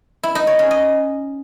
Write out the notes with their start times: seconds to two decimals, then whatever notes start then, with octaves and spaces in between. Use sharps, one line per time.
0.23 E4
0.35 D#4
0.47 C#5
0.59 C#4
0.71 D#5